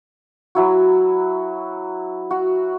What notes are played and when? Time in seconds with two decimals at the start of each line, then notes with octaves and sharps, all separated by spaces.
0.55 F#3 E4 F#4
2.31 F#4